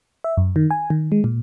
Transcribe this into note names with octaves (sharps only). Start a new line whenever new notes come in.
E5
F#2
D#3
G#5
D#3
G#3
A#2